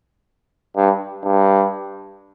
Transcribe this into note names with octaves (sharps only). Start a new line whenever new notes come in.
G2
G2